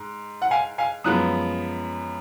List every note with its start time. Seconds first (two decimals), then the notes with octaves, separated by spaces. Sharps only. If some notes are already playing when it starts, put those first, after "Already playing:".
Already playing: G#2
0.42 F#5
0.51 F5 G#5
0.78 F5 G#5
1.04 F#2 F3 G#3 B3 D#6 F#6